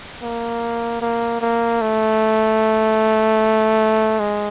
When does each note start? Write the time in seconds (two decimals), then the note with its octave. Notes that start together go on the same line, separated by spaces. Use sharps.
0.22 A#3
1.02 A#3
1.41 A#3
1.81 A3
4.19 G#3